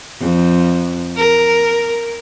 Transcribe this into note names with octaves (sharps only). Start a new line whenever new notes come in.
F2
A#4